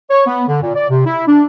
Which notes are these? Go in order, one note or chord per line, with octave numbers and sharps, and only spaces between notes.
C#5
B3
D3
A#2
D5
C3
E4
D4